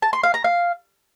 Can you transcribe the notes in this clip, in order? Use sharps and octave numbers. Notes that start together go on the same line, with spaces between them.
A5
C6
F5
A#5
F5